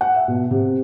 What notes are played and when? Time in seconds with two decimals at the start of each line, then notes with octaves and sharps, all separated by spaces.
0.01 F#5
0.16 E5
0.28 B2
0.51 C3